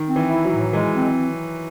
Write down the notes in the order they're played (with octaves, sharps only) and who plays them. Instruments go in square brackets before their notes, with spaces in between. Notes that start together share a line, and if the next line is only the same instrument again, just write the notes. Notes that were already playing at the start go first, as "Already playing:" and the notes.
Already playing: [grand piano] D#3
[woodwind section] C4
[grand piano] E3
[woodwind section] E4
[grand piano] F#3
[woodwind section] A2
[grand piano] E3 [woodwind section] G#3
[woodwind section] C4